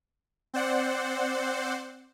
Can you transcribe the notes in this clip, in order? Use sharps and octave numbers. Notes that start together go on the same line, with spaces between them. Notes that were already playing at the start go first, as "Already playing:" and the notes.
C4 C5 D5 F#5